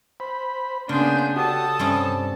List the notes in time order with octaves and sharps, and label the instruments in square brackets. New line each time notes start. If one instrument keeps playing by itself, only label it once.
[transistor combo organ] C5 B5
[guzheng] C#3 [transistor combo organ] A#3 [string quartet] B3 D4 G#4 [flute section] C6 G6
[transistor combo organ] F#4 G4 [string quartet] A4 A5 [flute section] D#6
[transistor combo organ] G2 [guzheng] C3 G3 C#4